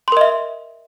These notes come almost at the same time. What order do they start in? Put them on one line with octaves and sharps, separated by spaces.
C6 A#4 D#5 E5